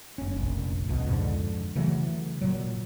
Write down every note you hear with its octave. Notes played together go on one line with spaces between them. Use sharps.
F#1 C#4
F1 A#1
C#2 B2
F2 G#2 D3
C#3 E3 F#3 A3
A#2 F#3